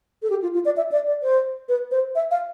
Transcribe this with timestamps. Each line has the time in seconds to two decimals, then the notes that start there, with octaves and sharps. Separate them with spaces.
0.22 A4
0.30 G4
0.42 F4
0.54 F4
0.65 D5
0.77 E5
0.92 D5
1.07 D5
1.23 C5
1.69 B4
1.91 C5
2.15 E5
2.31 F5